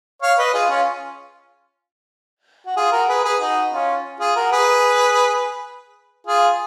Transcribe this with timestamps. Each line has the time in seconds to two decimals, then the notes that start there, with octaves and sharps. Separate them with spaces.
0.22 C#5 F5
0.38 B4 D#5
0.54 F4 G#4
0.70 C#4 F4
2.66 F#4
2.77 F4 G#4
2.92 F#4 A#4
3.09 G#4 B4
3.24 G#4 B4
3.40 D#4 F#4
3.72 C#4 F4
4.20 F4 G#4
4.36 F#4 A#4
4.52 G#4 B4
6.27 F4 G#4